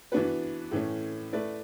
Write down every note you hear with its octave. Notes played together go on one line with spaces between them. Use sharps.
E3 B3 D4 F#4 B4
A2 E3 A3 C#4
A3 E4 B4 D5